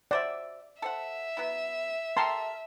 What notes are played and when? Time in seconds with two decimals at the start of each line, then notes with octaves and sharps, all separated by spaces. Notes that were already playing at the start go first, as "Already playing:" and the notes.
0.11 F#4 C5 D5 E5
0.82 A4 C5 E5 F#5
1.37 F#3 B3 E4
2.17 G4 A4 A#4 A5 C6